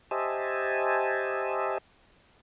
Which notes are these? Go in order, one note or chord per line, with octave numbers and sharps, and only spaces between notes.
G4 C5 D#5 E5 G#5 A5